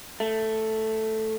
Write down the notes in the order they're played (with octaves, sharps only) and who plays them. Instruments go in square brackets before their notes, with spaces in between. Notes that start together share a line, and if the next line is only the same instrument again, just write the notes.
[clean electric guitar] A3